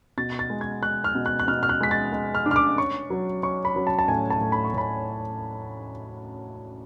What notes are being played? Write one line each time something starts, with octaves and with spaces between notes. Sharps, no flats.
B2 A6
A6
G#3
G#6
G#3 F#6
F6
B2
F#6
F#6
B2 F6
F6
F#6
G#3 B6
A6
G#3
F6
D4
F6
D6
C#4 C#6
F#3
C#4 C#6
B5
F#3
A5
A5
A2 G#5
A5
A2
B5
C#6
A2 B5